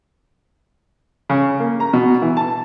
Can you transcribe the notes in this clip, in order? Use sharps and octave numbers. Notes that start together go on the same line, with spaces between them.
C#3
A#3
A#5
B2
E3
A5